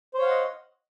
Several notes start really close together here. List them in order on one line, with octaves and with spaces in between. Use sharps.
C5 C#5 F5 F#5 D#5